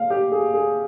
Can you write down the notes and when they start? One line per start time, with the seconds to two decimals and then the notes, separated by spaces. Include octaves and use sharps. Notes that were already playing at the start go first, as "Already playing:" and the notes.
Already playing: F5
0.10 G4
0.32 G#4
0.54 G#4